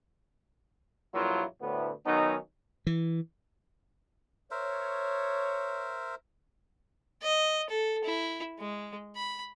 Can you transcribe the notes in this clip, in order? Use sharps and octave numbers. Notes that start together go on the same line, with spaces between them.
A#1 G2 F#3 A#3 E4 F4
D2 A2 B3
D#3 F#3 B3 C#4 D#4
E3
A#4 C5 C#5 E5
D#5
A4
E4
G#3
B5